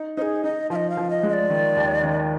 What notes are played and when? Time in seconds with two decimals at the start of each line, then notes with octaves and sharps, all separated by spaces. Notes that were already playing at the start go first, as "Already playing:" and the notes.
Already playing: D#4
0.17 D#4 G#4 C5
0.44 D#4 D#5
0.70 F3 F5
0.76 D#5
0.90 F5
0.97 F3
1.10 D#5
1.23 G#3
1.29 D#5
1.33 D5
1.50 D#3
1.76 D#2
2.03 D#3